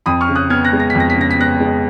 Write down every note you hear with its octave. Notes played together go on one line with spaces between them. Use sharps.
F2 B5 D#6
C#6 F6
C#3
D#6 F#6
B3 F6 G#6
F#6 A#6
G#3
A#6
B6
F2
A#6
B6
C#3 A#6
B6
B3 F#6 A#6
G#3